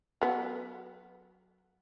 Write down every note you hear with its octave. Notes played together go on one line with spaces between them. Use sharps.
F#3 B3